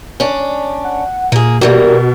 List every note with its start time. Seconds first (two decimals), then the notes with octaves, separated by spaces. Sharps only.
0.20 C#4 D4
0.84 F#5
1.32 A#2 A#3 G#4
1.61 B2 E3 G3 A#3 A#4